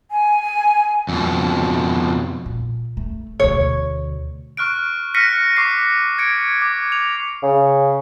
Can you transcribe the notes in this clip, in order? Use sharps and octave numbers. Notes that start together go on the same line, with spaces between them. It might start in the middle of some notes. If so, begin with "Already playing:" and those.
G#5
F2 B2
A#2
A3
D2 B2 C#5
C#6 F6 F#6 D7
F6 F#6 A#6 B6 C#7 D#7
C#6 D6 C7
G#6 C#7 D7
D6
F7
C#3